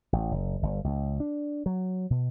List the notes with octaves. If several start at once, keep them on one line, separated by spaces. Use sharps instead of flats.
A1
F#1
G1
C#2
D4
F#3
B2